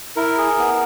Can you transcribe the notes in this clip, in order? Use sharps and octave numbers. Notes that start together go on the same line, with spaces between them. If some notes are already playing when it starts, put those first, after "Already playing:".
E4 A#4
G#4
B3